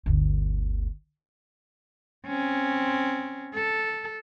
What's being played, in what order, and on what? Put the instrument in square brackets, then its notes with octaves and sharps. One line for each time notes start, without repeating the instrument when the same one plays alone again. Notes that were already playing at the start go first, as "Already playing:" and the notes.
[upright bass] G1 D2
[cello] C4 C#4
A4